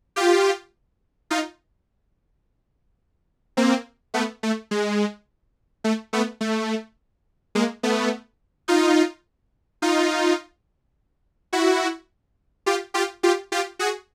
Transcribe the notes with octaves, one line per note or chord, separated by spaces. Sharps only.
F4 G4
D#4 F4
A#3 C4
A3 B3
A3
G#3
A3
A3 B3
A3
G#3 A#3
A3 B3
D#4 F4
D#4 F4
E4 F#4
F4 G4
F4 G4
F4 G4
F4 G4
F#4 G#4